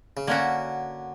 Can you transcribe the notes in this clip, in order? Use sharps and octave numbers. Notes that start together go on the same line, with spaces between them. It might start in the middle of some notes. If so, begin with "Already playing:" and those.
C#3
D3 A#3 C#4 F#4